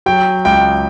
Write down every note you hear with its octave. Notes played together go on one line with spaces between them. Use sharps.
F#3 G5
C#2 G5